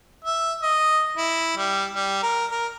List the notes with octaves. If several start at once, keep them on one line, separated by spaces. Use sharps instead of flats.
E5
D#5
E4
G3
G3
A#4
A#4